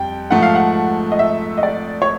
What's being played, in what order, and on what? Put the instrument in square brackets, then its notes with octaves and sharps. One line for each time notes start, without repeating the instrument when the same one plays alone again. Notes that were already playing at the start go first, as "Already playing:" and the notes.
Already playing: [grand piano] F2 G3 [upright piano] G5
[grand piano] G#2 F3 A3 [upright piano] F#5
[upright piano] F5
F#5
D#5
E5
D#5
D5
C#5